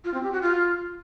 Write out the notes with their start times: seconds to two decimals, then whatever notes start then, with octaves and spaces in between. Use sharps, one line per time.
0.04 F4
0.14 C4
0.23 G4
0.33 F#4
0.42 F4